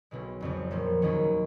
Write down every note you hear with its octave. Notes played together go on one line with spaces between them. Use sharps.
B1 B2 G#3
F#1 F2 C#3
A#1 A#2 F3 A#3
D#2 D#3 F#3 C#4